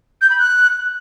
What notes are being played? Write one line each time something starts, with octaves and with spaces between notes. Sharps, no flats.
G6
B5
F#6